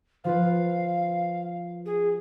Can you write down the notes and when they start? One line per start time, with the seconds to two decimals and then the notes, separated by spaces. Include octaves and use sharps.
0.24 F3 F4 B4 F5
1.86 G#4